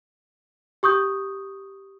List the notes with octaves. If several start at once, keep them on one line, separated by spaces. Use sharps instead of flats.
G4 C#6 D#6 G6